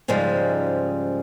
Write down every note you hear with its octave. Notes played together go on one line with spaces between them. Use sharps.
G#2 C#3 F3 G3 G#3